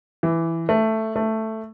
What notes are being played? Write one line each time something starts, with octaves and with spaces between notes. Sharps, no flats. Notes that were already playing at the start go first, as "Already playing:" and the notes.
E3
A3
A3